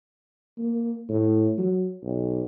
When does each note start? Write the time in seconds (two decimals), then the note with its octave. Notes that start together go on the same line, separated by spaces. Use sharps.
0.58 A#3
1.09 A2
1.58 F#3
2.03 B1